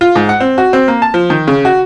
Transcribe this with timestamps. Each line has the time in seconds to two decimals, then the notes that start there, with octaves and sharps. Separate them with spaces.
0.01 F4
0.16 G#2
0.29 F#5
0.40 C4
0.58 F#4
0.73 C4
0.88 A#3
1.02 A5
1.14 F3
1.30 D#3
1.47 C#3
1.65 F#4